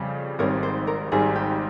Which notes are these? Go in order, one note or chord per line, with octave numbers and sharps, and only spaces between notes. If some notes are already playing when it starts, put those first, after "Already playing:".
Already playing: F2 C#3 G3
G#1 G#2 G3 C4 A#4 C#5
C5
A#4
G#1 G#2 G3 G#4
G4